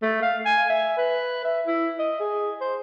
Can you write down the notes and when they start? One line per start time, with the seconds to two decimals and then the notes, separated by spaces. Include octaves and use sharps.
0.02 A3
0.22 F5
0.45 G#5
0.69 E5
0.98 B4
1.44 E5
1.67 E4
1.99 D#5
2.20 G#4
2.61 C5